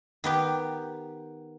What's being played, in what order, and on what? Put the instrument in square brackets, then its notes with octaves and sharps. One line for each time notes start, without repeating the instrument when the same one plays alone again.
[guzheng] D#3 B3 G4